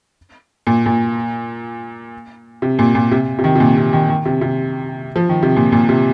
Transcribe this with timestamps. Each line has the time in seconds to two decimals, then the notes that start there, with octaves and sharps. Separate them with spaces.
0.67 A#2
0.86 A#2
2.62 C3
2.79 A#2
2.95 A#2
3.11 C3
3.39 C3
3.44 D#3
3.56 C3
3.60 A#2
3.77 C3
3.93 D#3
4.09 D#3
4.25 C3
4.41 C3
5.16 F3
5.29 D#3
5.43 C3
5.56 A#2
5.72 A#2
5.89 C3